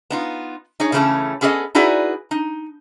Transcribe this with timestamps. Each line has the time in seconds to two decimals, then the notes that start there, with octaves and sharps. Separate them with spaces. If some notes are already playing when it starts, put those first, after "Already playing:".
0.10 B3 D#4 F4
0.80 D#4 G#4 C#5
0.92 C#3 E3 A3 A#3 C#4 A4
1.41 B3 C#4 G#4 A4 D5 D#5
1.75 D#4 E4 F#4 G#4 B4 D5
2.31 D#4